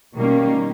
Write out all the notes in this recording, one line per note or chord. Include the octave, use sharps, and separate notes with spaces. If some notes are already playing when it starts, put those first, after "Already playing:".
B2 D#3 G3 A#3 C#4